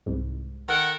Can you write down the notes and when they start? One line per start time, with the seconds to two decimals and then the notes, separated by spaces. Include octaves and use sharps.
0.06 C2 G#2
0.68 D#3 A4 A#4 F#5